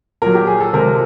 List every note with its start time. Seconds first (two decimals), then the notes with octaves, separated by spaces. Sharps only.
0.22 A#2 F#3 A#4
0.35 G4
0.47 G#4
0.61 A4
0.73 C3 F3 G#3 A#4